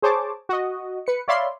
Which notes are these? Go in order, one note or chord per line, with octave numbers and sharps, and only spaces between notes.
G#4 C5 C#5 A5 D6
F#4 D#5
B4 C#7
C#5 D5 E5 F5 B5 C6